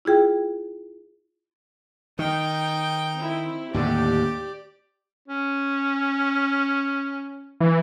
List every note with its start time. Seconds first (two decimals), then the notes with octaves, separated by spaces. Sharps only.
0.05 E4 F4 G#4 G5
2.19 D#3 D#4 G5
3.15 C4 E4
3.74 D#2 A2 D3 G4 D5
5.28 C#4
7.61 E3